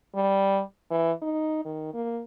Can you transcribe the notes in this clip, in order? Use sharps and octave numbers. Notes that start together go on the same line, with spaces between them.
G3
E3
D#4
D#3
A#3